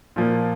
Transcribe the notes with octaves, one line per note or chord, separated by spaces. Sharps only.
A#2 F3 A#3